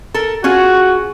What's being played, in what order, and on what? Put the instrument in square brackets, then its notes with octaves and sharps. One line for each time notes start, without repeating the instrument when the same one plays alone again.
[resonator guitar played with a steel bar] A4 A#4
[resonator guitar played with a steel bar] C#4 F4 G#4 [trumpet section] F#4